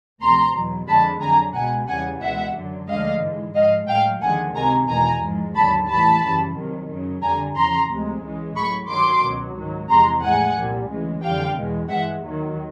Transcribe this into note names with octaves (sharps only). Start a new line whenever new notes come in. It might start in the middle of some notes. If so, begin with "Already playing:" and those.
D2 C3 F3 A#5 C6
E2 B2 F#3
F2 D3 F3 G#3 A5 B5
F2 D3 F#3 G#5 A#5
C#2 B2 G#3 F#5 G#5
E2 C#3 E3 G3 F#5 G#5
C#2 B2 G#3 E5 F#5
F#2 D3 F#3
D2 D3 F3 G#3 D#5 F5
G#2 E3 G#3
G#2 F3 G#3 D#5 F5
A2 F#3 F5 G5
D#2 D3 F3 G#3 F#5 G#5
C#2 C3 D#3 G#5 A#5
E2 B2 G#3 G#5 A#5
G#2 F3 G#3
D#2 D3 F#3 A5 B5
A2 E3 G3 A5 B5
F#2 C#3 E3 G3
C2 C3 D#3 F#3
F#2 C#3 F#3
F2 D3 G3 G#5 A#5
E2 C#3 F3 A#5 C6
D2 C3 F3 G#3
C#2 C#3 E3 G#3
A2 F#3 B5 C#6
G2 D#3 F#3 C6 D6
C#2 B2 F#3
G#2 D#3 F#3
E2 C3 F3 G#3 A#5 C6
A2 F3 G#3 F#5 G#5
C2 A#2 G3
D2 C#3 E3 G#3
F2 D3 G3 F5 G5
E2 B2 G#3
G2 E3 G#3 E5 F#5
D#2 D#3 F#3